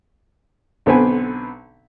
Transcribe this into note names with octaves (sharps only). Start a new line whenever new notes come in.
B1 D3 B3 C4 B4 G#5